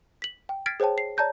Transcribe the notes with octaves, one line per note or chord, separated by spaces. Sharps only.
B6 F#7
G5
F6 G#6 A6 B6 C7 D7
G#4 C5 C#5 G5 A5
C7
C#5 D5 A5 A#5 G6 A#6